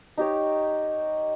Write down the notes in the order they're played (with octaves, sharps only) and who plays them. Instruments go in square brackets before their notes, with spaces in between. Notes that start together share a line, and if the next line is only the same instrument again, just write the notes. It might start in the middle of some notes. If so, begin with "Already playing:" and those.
[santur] D#4 G4 C#5